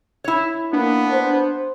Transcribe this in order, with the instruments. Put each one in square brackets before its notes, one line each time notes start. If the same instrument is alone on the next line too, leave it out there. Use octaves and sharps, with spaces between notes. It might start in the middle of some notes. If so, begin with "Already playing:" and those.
[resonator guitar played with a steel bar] E4 C#5
[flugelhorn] A#3 [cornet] B3 [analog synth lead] D4
[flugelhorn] C5